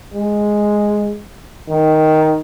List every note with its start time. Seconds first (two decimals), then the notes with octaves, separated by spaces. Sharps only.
0.14 G#3
1.69 D#3